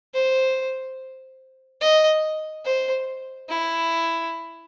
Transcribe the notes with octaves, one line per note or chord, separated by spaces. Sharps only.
C5
D#5
C5
E4